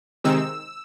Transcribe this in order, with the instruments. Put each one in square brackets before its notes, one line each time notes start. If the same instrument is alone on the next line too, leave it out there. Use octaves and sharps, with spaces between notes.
[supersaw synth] C3 D#3 G#3 C4 D#4 E6